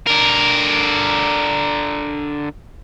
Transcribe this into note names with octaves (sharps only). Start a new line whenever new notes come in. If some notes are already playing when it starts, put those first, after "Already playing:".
D3 A#4